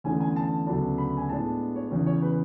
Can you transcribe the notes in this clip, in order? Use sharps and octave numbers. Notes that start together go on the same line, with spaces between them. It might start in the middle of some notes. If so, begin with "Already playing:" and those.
E2 D3 A3 C#4 G#5
G#5
A5
D2 C#3 F#3 B3 D4 A5
B5
G#5
A2 G#3 B3 D4 A5
C#5
E2 C#3 E3 C#5
C#5
B4